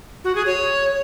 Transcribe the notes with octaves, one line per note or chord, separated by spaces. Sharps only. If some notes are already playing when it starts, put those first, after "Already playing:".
F#4
G#4
C#5